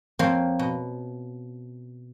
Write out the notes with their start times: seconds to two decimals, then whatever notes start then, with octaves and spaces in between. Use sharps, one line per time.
0.19 F2 F3 A#3 C4 C5 C#5
0.59 B2